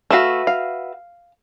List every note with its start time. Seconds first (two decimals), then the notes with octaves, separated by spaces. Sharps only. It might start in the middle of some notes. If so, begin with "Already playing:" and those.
0.10 A3 F#4 B4 E5 F5
0.47 F5